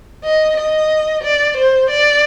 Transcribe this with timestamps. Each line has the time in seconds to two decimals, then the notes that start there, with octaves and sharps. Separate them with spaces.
0.24 D#5
0.56 D#5
1.23 D5
1.57 C5
1.90 D5